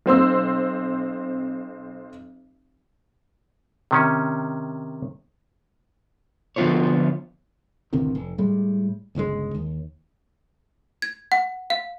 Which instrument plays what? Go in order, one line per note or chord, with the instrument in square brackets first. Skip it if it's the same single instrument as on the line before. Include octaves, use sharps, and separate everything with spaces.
[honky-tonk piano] B1 C4 C5 E6
[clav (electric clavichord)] C3 D#3 C#4
[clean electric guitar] D3 F3 B3 F4 C5 C#5
[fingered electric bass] A1 D2 C3 D#3
F1
A2 G3 G#3
G1 C#2 D3 G#3
D#2
[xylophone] G#6
F#5
F5